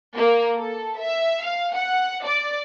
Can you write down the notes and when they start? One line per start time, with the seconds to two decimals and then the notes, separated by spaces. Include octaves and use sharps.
0.16 A#3
0.58 A4
0.98 E5
1.44 F5
1.75 F#5
2.26 D5